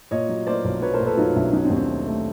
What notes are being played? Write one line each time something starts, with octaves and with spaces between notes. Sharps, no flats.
A#2 C#5 D#5
F#3
A#3 C5 D5
B1
F#3 B4 C#5
A#4 C5
A#2
A4 B4
F#3 D#4 F4
B1 D4 E4
F#3 C#4 D#4
C4 D4
D#2
C4
A3
A3